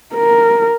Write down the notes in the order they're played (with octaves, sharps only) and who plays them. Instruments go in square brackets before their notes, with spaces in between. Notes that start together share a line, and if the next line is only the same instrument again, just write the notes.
[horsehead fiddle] A#4